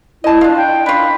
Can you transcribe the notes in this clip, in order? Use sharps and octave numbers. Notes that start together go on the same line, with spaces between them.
E4 D#5 A5
D4 F4
G5
D4 F4 B5